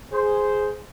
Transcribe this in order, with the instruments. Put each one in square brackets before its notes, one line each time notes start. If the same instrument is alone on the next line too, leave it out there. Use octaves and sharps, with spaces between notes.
[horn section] G#4 C5